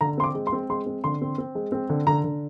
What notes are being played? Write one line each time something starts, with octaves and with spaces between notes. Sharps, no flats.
D3 A#5
C4 C6
D6
G#3
C6
C4
G#3 C6
C4
D3 C6
C4
C4
G#3
C4
D3
D3 A#5
D3